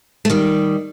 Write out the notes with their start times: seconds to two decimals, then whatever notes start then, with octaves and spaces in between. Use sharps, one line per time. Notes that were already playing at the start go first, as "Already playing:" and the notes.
0.25 A3
0.30 D#3 G3